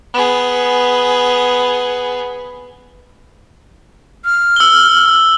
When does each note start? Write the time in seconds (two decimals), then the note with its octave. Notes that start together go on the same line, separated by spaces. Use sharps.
0.13 B3 G#4
4.25 F6
4.56 E6 G7